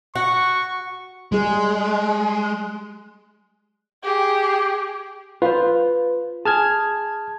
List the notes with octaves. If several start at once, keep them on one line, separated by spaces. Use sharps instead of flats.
F#4 C#6
G3 G#3 G#4
G4 G#4
F4 B4 C5
G#4 A5 F6 G#6